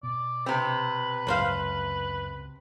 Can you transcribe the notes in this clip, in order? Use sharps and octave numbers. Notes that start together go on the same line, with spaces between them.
B2 D5
C3 C4 B4
C#2 F#2 C5 F5